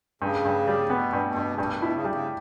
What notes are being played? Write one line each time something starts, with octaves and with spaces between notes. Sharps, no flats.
G2 C#3
G2
G3
B2 B3
G2
B2
G2
C#3
G2 B2
B2
E4
C#3
G3
C#3